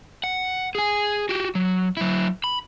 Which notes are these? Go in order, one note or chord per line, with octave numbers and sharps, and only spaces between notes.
F#5
G#4 G#5
F#4 G4
F#3
F#3 E4
B5